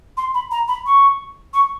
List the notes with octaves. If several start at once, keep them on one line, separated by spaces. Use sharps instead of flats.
C6
B5
A#5
B5
C#6
C#6